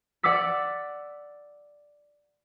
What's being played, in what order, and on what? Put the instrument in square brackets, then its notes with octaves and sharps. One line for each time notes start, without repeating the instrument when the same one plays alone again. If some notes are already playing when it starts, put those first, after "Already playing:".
[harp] D5 F#5 D6 E6 B6